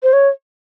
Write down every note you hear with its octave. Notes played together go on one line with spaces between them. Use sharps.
C5
C#5